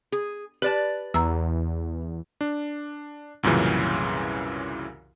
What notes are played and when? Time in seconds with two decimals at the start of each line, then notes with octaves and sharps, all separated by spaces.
0.12 G#4
0.62 G4 B4 D5 A5
1.14 E2 A#5 E6
2.41 D4
3.43 C2 F#2 A#2 C#3 E3